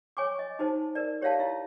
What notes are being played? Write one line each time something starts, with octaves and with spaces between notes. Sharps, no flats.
C#5 G#5 C#6 D6
D#5
D#4 F#4 C5 A5
A#4 D5
G4 C#5 D5 E5 F5 A5
E4 E5